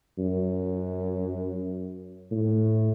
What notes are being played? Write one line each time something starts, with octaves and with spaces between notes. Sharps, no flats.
F#2
A2